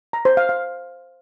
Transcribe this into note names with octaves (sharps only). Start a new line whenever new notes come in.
A#5
C5
F5
F5